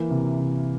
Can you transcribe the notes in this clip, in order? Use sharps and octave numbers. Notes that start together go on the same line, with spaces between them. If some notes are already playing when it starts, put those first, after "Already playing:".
Already playing: E3 A#3
C3
C3